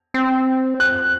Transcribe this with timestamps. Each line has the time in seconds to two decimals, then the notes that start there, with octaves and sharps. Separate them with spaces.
0.14 C4
0.80 F#6